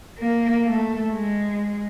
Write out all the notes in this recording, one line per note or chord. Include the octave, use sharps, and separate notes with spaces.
A#3
A3
G#3